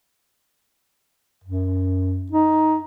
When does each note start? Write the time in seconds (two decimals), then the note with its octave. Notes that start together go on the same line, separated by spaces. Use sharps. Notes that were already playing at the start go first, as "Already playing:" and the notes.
1.44 F#2
2.32 D#4